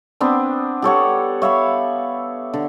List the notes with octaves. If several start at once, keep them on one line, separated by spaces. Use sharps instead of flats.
B3 C4 D4
G4 A4 C#5 F#5
C#5 E5 F5 B5
D3